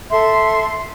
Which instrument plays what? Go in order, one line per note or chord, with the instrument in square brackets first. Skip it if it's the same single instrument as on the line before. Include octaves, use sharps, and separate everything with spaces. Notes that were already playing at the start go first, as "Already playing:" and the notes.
[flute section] A4 E5 C6